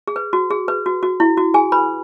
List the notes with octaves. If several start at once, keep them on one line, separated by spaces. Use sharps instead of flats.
G#4
B4
F#4
G#4
B4
F#4
F#4
E4
F#4
G#4 G#5
B4 B5